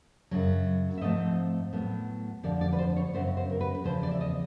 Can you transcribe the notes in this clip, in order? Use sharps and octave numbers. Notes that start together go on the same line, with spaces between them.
F#2 C#3 F#3
E5
G#2 F3 A3 C4 D#5
A2 F#3 B3
F2 D3 F3 D5
D5
B4
C5
C#5
F#2 C#3 F#3 B3 C5
C5
A#4
B4
B4
E2 C#3 F3 C5
D5
E5
D#5